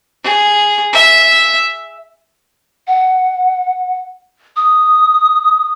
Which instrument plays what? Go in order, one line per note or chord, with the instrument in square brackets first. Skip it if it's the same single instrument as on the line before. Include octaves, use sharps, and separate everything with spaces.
[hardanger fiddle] G#4
E5
[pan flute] F#5
D#6